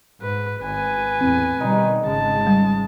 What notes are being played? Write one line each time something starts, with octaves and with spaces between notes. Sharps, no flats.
G#2 B4
G#1 B4 G#5
E2 A2 C4
B2 D#3 G3 D#4
G#1 C#3 G#3 A5
G3